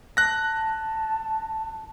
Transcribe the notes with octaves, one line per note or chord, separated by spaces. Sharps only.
A5 F#6 A#6